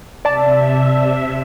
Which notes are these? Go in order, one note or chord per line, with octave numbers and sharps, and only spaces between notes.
C3 D5 E5 A5